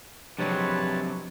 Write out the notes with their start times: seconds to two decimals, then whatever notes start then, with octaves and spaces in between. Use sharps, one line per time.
0.39 C3 F3 F#3 G#3 D4 B4 C#5 A5